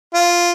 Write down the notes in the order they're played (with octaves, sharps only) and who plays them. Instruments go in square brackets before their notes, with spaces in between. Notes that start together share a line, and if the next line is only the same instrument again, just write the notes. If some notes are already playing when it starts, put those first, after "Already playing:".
[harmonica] F4